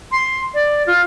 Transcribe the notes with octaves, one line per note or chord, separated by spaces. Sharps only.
C6
D5
F4